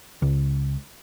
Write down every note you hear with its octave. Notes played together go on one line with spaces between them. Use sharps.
C#2